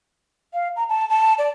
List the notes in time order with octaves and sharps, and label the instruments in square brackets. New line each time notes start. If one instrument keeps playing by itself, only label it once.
[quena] F5
A#5
A5
A5
D5